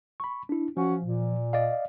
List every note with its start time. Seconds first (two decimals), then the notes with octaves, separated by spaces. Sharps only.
0.20 B5 C#6
0.49 D4 E4
0.77 F3 C#4 F#4
1.02 A#2
1.53 D5 D#5 F5